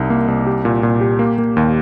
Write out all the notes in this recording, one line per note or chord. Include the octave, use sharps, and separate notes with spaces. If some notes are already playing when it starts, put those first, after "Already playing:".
Already playing: C2 D#4
A#3
C2
G4
A#2
A#2
G4
A#3
A#3
D#2